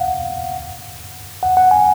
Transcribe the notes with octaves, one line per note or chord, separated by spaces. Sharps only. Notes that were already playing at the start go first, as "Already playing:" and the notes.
Already playing: F5 F#5
F#5
F#5
G#5